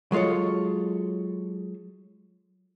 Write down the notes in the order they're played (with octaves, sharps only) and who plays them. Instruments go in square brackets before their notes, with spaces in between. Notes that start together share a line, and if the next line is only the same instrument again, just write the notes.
[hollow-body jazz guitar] F#3 G#3 F4 A4 C#5